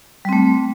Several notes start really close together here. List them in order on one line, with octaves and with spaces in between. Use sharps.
G3 C4 A3